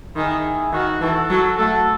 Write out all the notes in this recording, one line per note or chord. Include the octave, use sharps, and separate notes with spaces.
D#3 E4 G#4
D#3 F#4
E3 F#4 A4
F#3
A3 F#4 A4